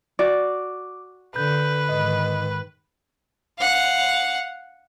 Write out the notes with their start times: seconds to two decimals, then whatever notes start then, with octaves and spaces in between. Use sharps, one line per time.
0.19 F#4 D5 D6
1.36 D3 B4 G6
1.89 G#2 D#3 D#5
3.59 F5 F#5